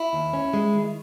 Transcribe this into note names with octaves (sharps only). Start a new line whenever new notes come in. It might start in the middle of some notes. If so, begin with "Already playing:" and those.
Already playing: E4
D#2
C#4
G#3
D#3